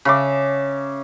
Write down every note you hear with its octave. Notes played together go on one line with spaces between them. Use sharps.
C#3 E5 D6